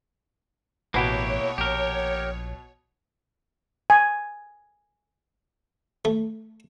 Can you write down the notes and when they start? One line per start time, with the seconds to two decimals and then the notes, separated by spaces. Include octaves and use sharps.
0.94 A1 B2 A#3 E4 G4 B4 C#5 F#5
1.58 A#1 G4 A#4
3.90 G#5
6.05 A3